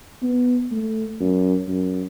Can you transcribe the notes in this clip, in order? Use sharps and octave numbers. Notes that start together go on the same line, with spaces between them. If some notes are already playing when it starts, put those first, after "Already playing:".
B3
A3
F#2
F#2